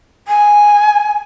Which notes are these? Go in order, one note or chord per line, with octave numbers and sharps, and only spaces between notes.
G#5